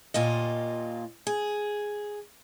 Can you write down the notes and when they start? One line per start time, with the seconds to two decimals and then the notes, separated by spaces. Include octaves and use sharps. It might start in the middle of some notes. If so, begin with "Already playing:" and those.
0.14 D#2 A#2 F4 D#5
1.27 G#4